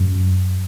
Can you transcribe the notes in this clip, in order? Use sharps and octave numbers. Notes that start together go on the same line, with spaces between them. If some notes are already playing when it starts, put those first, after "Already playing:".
Already playing: F#2